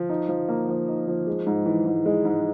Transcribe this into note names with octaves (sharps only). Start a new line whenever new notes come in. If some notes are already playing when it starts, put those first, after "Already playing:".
Already playing: F3
D#4
F3
A#3
F3
D#4
F3
G#3
G#2
E3
G#2
G#3
G#2